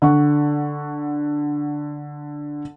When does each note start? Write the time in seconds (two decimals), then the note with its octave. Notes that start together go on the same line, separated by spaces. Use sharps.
0.02 D3 F#5 C#6